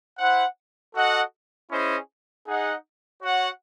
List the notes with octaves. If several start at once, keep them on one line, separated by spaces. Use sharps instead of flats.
E4 C5 F#5
F#4 A4 D#5 F#5
C#4 E4 G#4 C5 D#5
D#4 G#4 D#5 F#5
F#4 C#5 F#5